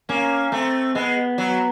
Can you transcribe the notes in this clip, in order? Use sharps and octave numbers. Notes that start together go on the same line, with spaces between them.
A#3 C#4
A3 C4
G#3 B3
F#3